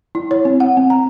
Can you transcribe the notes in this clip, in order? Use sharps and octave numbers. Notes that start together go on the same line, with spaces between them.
E4
C#5
C4
F#5
C4
A#5